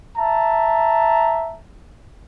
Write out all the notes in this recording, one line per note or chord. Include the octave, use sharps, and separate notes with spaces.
E5 A5 A#5